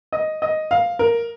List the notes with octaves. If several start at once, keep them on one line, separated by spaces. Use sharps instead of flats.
D#5
D#5
F5
A#4